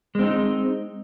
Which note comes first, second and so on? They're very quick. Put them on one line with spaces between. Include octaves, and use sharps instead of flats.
G#3 C4 D#4